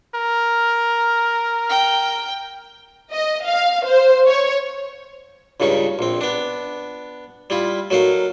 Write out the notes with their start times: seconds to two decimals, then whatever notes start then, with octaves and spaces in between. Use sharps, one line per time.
0.14 A#4
1.69 G5
3.12 D#5
3.45 F5
3.86 C5
4.26 C#5
5.60 C#2 G2 C#3 D#4 C#6
5.99 A#1 C4
6.21 B3 D4
7.50 G3 E4 F4
7.90 F#3 A3 D#4 A#4 F5